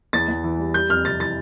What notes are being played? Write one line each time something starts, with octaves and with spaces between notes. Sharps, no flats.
E2 A6
E2
E3
G3
G3 G6
F2 F6
C3 A6
E3 A6